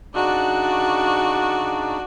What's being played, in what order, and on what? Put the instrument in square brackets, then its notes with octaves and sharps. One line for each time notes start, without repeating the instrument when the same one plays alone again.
[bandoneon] C#3 D4 D#4 [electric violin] F#4 D5